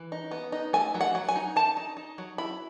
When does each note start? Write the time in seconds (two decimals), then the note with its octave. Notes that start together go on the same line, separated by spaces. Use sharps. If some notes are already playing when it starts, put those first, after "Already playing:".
Already playing: E3
0.12 D#4
0.31 B3
0.52 D#4
0.73 A3 G#5
0.95 F#3
1.01 F#5
1.15 F#3
1.29 G#5
1.36 D#4
1.56 D#4 A5
1.77 D#4
1.97 D#4
2.18 F#3
2.38 E4 B5